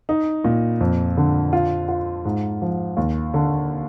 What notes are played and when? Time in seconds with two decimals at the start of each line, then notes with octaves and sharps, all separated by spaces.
0.09 D#4
0.45 A#2
0.80 F2
1.17 D3
1.53 F4
1.88 F4
2.25 G#2
2.62 F3
2.97 D#2
3.34 D3